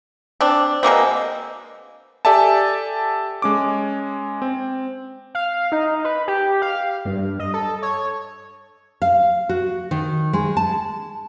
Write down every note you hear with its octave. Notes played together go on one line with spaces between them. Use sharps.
C4 D4
B2 G#3 A#3 C4
G4 A4 D5 E5 G#5 A5
G#3 C#4 D6
C4
F5
D#4
B4
G4
F5
G2
D#5
A4
C#5
F5
F#4
D#3
G#3
A5